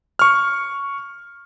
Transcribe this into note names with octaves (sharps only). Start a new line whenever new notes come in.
C#6 F6